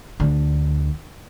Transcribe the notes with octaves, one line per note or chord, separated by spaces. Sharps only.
D2 D3